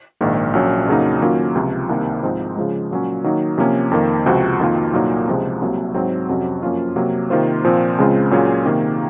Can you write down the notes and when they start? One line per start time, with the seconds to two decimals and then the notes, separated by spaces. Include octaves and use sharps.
0.21 A#1 G#2 D#3 A#3
0.53 A#1 A#2 F#3 C#4
0.87 F2 C#3 F#3 A#3 D#4
1.21 D#3 F#3 A#3 C#4 F4
1.55 C#2 C3 F3
1.89 C2 C3 D#3 A#3
2.23 G#2 F3 C4 D#4
2.56 C#3 F3 G#3
2.91 A#2 F#3 C#4
3.24 D#3 F#3 A#3 D#4
3.58 C3 F3 A#3 C#4
3.91 F2 D#3 A#3
4.26 C#2 C3 F3 C4 F#4
4.60 F2 D#3 A#3 F4
4.93 C2 A#2 F#3 A#3 D#4
5.27 C#2 C3 F3 G#3
5.62 C2 C3 F#3 A#3
5.94 G#2 F#3 C4
6.29 F2 C3 F#3 C#4 F#4
6.63 F#2 F3 A#3 C#4 F4
6.96 C3 F#3 A#3
7.30 C3 D#3 A#3 F4 C5
7.64 A#2 F3 C4
7.98 C#2 C#3 G#3 C4 F4
8.31 A#2 F#3 C#4 F4 G#4
8.65 C3 D#3 A#3